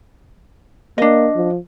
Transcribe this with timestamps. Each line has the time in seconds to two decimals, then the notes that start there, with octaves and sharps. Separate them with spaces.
0.98 A#3 D4 D#5
1.35 F3